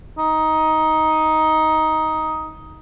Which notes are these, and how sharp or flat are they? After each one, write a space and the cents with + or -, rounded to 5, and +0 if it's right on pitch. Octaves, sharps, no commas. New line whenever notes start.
D#4 +10